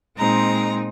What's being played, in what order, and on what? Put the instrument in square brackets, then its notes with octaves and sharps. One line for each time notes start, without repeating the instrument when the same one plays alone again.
[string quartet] A#2 G#3 C4 D#4 A#5